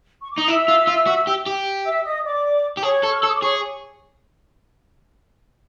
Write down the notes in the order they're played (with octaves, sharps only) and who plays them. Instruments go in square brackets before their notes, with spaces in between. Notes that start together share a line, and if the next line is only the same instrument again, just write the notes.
[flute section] C#6
D6
[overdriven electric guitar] D#4 [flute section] D#6
[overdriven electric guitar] E4 [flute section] E5 E6
[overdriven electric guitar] F4
F4
F#4
G4
G4
[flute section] E5 E6
D#5 D#6
D5 D6
[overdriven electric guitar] G4
[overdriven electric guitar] G#4 [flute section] C#5 C#6
[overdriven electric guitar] A4
[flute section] F6
E6
[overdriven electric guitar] A4
[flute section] D#6
D6
[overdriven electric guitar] G#4 [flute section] C#5 C#6